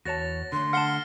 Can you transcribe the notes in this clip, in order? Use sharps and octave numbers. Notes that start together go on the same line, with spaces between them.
E2 F#4 C#5 A5 A6 A#6
D3 A3 C6
F#5 A5 F6 C7 G7